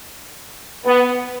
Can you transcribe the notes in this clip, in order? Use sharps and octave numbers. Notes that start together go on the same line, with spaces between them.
B3